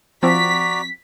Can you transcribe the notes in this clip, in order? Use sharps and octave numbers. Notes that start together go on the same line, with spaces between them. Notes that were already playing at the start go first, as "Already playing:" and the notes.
F3 C4 F#4 D5 A#5 B6